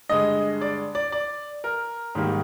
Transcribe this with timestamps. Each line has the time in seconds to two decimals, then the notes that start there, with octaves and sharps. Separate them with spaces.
0.09 G2 D3 G#3 D#5
0.61 D5
0.95 D5
1.12 D5
1.64 A#4
2.15 G#2 D#3 G3 A#3